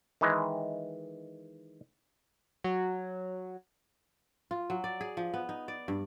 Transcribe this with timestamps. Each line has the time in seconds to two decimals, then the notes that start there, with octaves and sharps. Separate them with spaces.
0.21 D#3 E3 G#3
2.64 F#3
4.51 F4
4.70 F#3
4.84 D5
5.01 G#4
5.17 F3
5.34 B3
5.49 D#4
5.68 D5
5.88 G2